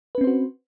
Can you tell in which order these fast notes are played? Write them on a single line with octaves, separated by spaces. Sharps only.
B4 C#4 C4 C5 F#4